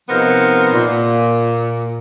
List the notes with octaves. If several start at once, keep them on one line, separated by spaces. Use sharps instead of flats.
C3 F3 B3 D#4 A#4 C5
A#2